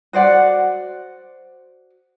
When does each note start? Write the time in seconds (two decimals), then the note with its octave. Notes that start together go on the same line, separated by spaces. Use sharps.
0.13 F#4 C5 D5 F#5